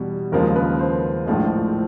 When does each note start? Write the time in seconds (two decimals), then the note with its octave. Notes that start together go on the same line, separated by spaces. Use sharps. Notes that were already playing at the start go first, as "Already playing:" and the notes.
Already playing: E2 B2 G3
0.32 D#2 C#3 F3 G#3 A#4
0.56 B4
0.79 C5
1.26 A#1 A2 F3 G#3